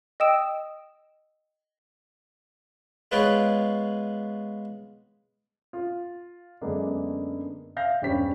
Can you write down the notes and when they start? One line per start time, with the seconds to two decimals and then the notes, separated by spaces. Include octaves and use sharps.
0.20 D#5 G5 D#6 E6 D7 E7
3.12 G#3 B3 F4 B4 C#5 G5
5.73 F4
6.61 F#2 D3 G#3 A#3 B3 D4
7.76 E5 F5 G6 A#6
8.01 E1 G2 G3 C#4 C5 B6